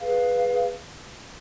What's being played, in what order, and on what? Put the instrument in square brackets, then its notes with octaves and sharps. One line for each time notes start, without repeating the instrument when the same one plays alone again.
[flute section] G#4 B4 F5